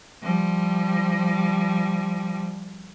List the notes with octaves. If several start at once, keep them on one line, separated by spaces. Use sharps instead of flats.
F3 G3